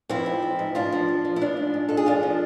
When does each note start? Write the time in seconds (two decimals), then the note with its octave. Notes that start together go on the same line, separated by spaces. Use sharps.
0.09 F3 C4 E4
0.26 G#2
0.43 F3
0.59 G#2
0.75 F3 D4 F4
0.92 F3
1.08 F3
1.25 F3
1.36 E4
1.41 F3 D4 F4
1.57 G#2
1.74 G#2
1.89 G#2 A4
1.97 G#4
2.06 F3 D4 F4
2.23 F3